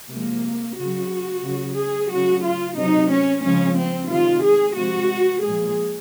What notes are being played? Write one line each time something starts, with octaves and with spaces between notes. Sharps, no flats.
C3 F3 G#3 A#3
C#3 F#3 F#4
C#3 F#3
G#4
C#3 F#3 F#4
F4
C3 F#3 D#4
C#4
C#3 F3 G#3 C#4
C4
C3 D#3 G#3 F4
G#4
C3 F3 G#3 F#4
A#2 F3 G#3 G#4